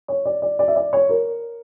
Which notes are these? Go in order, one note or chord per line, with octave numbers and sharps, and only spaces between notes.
C#5
D5
D5
D5
E5
D5
C#5
A#4